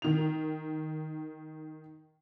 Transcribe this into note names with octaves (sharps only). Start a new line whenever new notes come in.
D#3 F7